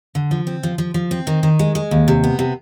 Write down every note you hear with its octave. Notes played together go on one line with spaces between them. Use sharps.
D3
F3
C4
F3
F3
F3
C4
D#3
D#3
G#3
G#3
D#2
C3
B3
C3